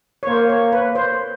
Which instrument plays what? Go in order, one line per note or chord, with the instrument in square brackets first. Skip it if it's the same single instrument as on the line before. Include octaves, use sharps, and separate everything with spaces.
[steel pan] C#5
[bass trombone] A#3 [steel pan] C5
[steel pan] C#5
B4
C5